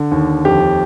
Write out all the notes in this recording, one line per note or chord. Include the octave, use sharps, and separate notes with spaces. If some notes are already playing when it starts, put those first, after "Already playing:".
Already playing: D3
D#2
F2 G4